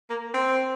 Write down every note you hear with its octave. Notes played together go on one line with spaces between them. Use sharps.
A#3
C4